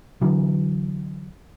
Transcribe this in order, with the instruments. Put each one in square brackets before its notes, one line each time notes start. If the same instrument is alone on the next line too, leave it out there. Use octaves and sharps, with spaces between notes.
[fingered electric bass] D3 E3 F#3